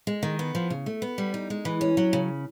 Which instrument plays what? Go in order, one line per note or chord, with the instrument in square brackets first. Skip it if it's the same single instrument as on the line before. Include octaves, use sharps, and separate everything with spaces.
[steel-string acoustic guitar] G#3
D#3
B3
F3
C#3
A3
B3
G3
D#4
G#3
E3
C#4
F#3
C#3